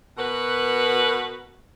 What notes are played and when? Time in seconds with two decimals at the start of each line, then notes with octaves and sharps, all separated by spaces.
0.18 B2 F#4 A#4 B4